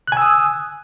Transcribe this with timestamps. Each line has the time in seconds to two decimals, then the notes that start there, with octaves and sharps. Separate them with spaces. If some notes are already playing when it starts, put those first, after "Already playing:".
0.07 F#6
0.12 G#5
0.17 E6
0.22 D#6